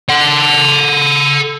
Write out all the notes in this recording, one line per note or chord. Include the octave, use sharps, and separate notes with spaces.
A4 F#5